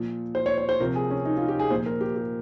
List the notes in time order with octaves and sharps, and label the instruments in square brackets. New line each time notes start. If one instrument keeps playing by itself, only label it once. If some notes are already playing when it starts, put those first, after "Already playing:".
Already playing: [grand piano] A#2 F3
C5
C#5
C#5
C5
C3 F3 A#4
G#4
C#4
D#4
F4
G4
G#4
A#2 F3 C5
A#4
G4
G4